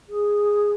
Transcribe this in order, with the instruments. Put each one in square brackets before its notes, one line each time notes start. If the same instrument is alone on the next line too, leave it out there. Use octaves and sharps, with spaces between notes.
[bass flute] G#4